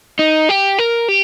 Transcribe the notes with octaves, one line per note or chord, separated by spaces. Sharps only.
D#4
G4
A#4
G4